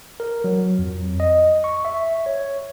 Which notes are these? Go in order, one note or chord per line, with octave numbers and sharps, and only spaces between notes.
A#4
F#3
F2
D#5
C#6
E5
C#5